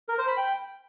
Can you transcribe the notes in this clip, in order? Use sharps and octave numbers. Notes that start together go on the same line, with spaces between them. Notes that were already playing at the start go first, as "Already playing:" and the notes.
A#4
C5
B5
G5